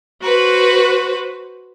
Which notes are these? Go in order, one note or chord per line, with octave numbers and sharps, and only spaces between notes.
F#4 B4 C5